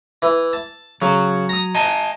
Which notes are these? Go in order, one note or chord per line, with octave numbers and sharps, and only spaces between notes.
E3
A5
C#3 F#3
A#5 D#6
D#5 G#5 A5